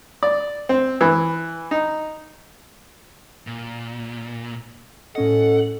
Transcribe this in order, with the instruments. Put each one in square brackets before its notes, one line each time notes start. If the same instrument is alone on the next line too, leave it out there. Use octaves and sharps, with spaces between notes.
[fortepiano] D5
C4
E3
D#4
[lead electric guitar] A#2
[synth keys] A2 C#4 D#5 [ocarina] A4 [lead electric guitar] F#5